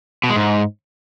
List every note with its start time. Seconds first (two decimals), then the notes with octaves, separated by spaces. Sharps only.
0.24 B2
0.30 G#3
0.36 G#2